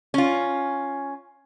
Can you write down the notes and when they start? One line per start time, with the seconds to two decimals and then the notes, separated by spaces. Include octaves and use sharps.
0.14 C#4 F4